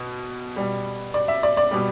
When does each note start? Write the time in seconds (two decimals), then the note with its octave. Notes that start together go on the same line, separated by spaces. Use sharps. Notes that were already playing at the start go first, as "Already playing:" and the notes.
Already playing: B2
0.56 B2 G3
1.14 D5
1.28 E5
1.43 D5
1.57 D5
1.71 B2 G3